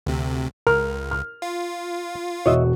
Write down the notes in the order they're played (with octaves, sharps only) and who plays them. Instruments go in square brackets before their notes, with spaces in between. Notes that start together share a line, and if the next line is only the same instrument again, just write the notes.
[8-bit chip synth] D2 C3
[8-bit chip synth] C#2 [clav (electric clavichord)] A#4 [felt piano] F6
[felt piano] F6
[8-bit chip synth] F4
[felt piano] E1 F#4 [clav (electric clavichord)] C#5 D#5 E5